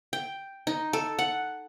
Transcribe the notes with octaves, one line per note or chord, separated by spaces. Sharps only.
G5
D#4
A4
F#5